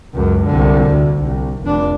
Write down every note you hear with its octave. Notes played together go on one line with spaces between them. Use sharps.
C#2 F#2
C2 D3
D2
C2
F1 D4